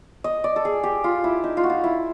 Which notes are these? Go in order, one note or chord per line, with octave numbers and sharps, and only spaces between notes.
D#5
D5
A4
G#4
G4
F4
E4
D#4
F4
F#4
F4
E4